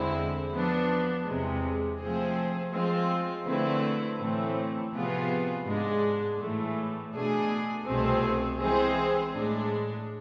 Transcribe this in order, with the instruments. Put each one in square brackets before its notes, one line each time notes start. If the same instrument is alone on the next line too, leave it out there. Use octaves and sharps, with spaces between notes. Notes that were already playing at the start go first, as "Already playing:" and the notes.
Already playing: [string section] E2 D3 G#3 C4 E4
F3 B3 D4
E2 C3 G#3
F3 A3 C4 G#4 C5
F3 G#3 C4 F4
D3 A3 C4 E4 B4
A2 E3 A3 C4
C3 F3 B3 F4 G#4
G#2 G#3 D4
A2 E3 A3
B2 A3 D4 G#4
C2 B2 A3 C4 G#4
E3 G#3 C4 G#4 C5
A2 G#3 D4